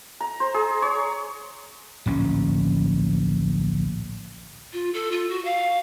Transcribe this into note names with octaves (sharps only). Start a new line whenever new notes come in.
A#5
C5
G#4
C#5
D1 A#1 C#4
F4
A4
F4
F#4
F5